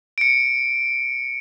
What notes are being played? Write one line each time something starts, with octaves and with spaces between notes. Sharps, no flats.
C#7 D7